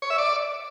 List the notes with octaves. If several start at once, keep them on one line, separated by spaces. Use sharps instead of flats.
C#5
E5
D5